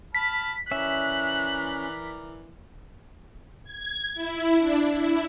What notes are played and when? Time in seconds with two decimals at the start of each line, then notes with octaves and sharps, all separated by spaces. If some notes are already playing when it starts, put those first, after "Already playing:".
0.15 A5 B5 F6 B6
0.71 E3 C#4 A#4 D5 E5 F#6
3.64 G#6
4.15 E4
4.58 D4
4.93 E4